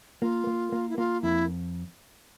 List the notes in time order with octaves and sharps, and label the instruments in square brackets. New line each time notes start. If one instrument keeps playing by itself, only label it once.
[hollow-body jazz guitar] A#3 [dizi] F4
[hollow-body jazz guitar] A#3
A#3
[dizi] E4
[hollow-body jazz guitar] A#3 [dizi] F4
[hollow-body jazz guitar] F2 [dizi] E4